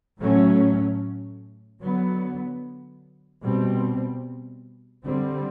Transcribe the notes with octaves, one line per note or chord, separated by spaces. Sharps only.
A2 F#3 A3 C#4
D3 F#3 B3
B2 G3 C4
D3 G3 C4